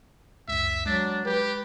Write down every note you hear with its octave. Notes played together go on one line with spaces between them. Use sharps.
C#2 F#2 E5
F#3 G#3 D4 A6
G4 B4